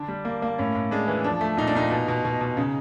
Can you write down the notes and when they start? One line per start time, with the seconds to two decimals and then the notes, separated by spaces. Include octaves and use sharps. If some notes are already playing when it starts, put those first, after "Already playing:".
Already playing: D3 D4
0.08 G3
0.25 A#3
0.42 A#3
0.59 A2 C#4
0.75 A2
0.91 G#3 D4
1.08 E3
1.24 F3 D4
1.41 A3
1.57 A#2 D#4
1.67 D4
1.75 A#2 D#4
1.91 B2
2.08 B2
2.25 B2
2.41 B2
2.57 C#3